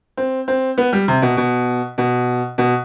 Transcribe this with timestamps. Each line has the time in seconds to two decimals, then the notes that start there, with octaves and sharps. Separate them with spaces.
0.17 C4
0.48 C4
0.78 B3
0.93 G3
1.08 C3
1.22 B2
1.37 B2
1.98 B2
2.58 B2